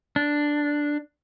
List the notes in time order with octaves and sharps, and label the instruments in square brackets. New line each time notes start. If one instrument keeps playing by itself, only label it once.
[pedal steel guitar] D4